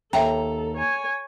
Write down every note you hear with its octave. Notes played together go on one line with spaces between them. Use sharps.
D#2 A4 E5 G5 A#5
C#5 G#5